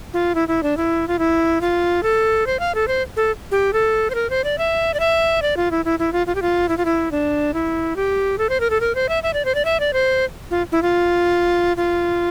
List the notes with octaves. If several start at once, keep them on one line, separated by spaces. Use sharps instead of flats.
F4
E4
E4
D4
E4
F4
E4
F4
A4
C5
F5
A4
C5
A4
G4
A4
C5
A#4
C5
D5
E5
D5
E5
D5
F4
E4
E4
E4
F4
F4
G4
F4
E4
F4
E4
D4
E4
G4
A4
C5
A#4
A4
A#4
C5
E5
E5
D5
C5
D5
E5
D5
C5
F4
E4
F4
F4